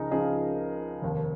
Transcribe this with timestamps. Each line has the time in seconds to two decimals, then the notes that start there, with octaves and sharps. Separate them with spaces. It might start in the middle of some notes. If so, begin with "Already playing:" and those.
Already playing: C#2 C#3 F3 D#4 G#4 A#4
0.11 C#2 C#3 F3 D#4 G#4
1.02 F1 D#2 D#3